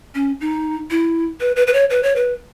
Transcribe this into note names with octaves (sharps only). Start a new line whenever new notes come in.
C#4
D#4
E4
B4
B4
B4
C#5
B4
C#5
B4